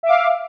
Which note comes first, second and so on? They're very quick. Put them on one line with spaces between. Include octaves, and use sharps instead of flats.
E5 D6 F5